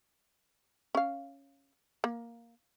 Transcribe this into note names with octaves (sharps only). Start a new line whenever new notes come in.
C#4 F5
A#3